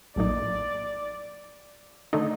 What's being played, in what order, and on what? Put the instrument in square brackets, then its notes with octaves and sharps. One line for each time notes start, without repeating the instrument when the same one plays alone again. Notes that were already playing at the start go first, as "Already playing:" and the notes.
[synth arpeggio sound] A#1 A2 F#3 A#3 D#4 [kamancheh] D5
[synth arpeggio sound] D3 A3 D#4